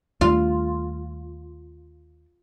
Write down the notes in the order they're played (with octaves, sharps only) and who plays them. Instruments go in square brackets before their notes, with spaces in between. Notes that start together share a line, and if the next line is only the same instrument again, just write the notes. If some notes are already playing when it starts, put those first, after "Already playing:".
[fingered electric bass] D#2 G3 A3 [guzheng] F4